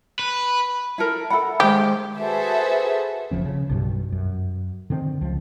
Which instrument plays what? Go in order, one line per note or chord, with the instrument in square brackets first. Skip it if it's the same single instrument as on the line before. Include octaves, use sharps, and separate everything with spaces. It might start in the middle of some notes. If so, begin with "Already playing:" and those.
[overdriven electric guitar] B4
[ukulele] E4 A4 A#4
[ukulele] A4 F#5 [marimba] E5 B5
[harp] D#3 G#3 [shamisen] G4 [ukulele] C5
[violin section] F#4 G#4 A4 B4 C5 E5
[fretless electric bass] F#1 E2 F3 C#4
C#3
B1 G2
F#2
D3 D#3 C4
C#2 F3